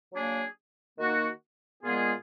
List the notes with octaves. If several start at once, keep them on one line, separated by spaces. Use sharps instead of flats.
F#3 A#3 D4 G#4
D#3 A#3 D#4 F#4
A#2 G#3 B3 F4 G#4